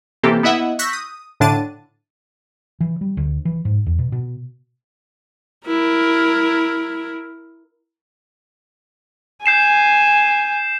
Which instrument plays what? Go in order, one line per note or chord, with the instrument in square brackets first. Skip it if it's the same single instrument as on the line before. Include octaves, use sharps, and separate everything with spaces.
[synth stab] C3 E3 A#3 C4 G4 A4
B3 E4 D#5 E5 F#5
C#6 E6 F#6 G6 A#6 B6
D#6
A2 D3 D4 A5 A6 D#7
[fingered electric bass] E3
G3
D2
E3
G#2
E2
B2
B2
[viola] E4 A#4
[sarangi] G#5 [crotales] G6 C7 E7